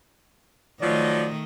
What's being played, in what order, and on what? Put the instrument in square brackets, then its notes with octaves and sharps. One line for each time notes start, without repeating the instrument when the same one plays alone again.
[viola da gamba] D#3 A3 D#5 [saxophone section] F3 F#3 [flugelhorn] D5